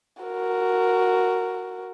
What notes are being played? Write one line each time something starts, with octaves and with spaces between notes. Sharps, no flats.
F#4 A#4